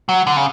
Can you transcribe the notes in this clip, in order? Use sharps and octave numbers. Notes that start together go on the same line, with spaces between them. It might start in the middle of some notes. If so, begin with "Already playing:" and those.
F#3
D3
C#3